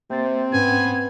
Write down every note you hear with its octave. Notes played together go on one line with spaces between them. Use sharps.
C3 A#3 C4 A6
G#2 B3 C#4 G#5